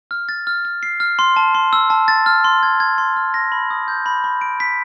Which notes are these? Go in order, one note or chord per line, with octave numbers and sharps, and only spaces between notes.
F6
A6
F6
F6
C7
F6
C6
A5
C6
E6
A5
A6
F6
C6
G#6
G#6
C6
F6
A#6
B5
D#6
G6
B5
B5
D7
B6